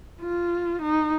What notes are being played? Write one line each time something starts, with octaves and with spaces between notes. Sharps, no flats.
F4
D#4